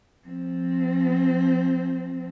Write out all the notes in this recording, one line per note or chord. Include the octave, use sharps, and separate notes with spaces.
F3 C4